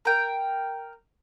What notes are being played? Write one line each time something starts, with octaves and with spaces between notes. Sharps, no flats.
A#4 G5